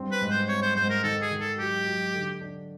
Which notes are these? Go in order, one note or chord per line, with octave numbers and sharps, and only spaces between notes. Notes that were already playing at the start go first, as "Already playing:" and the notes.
Already playing: G2 C4
B4
G#2
C5
C4 C#5
C5
G#2 C5
A#4
D#3 A4
G#4
D#3
A4
F#3 G4
F#3
D3
D4